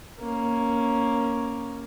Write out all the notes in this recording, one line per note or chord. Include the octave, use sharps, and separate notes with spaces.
A#3 C#4